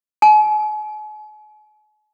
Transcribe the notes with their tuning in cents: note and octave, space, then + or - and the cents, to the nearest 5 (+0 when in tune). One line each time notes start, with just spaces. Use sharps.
G#5 +45